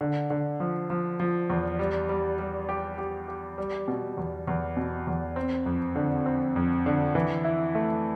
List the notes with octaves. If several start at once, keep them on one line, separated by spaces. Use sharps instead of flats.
D3
D3
F3
F3
F3
E2
G3
G3
G3
G4
G4
G4
G3
B2
E2
E2
B2
E2
C4
F2
D3
C4
F2
D3
E3
E4
A3